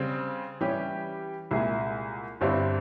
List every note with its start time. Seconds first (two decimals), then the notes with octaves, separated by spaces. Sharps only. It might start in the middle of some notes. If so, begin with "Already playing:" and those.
Already playing: C#3 G3 C4
0.61 E3 G3 C#4 G4
1.51 C2 A#2 G#3 E4 G#4
2.41 G1 G2 G3 C4 E4